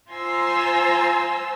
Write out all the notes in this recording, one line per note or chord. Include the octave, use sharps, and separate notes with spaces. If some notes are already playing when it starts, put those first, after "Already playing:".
F4 C5 G#5 A#5 C6 E6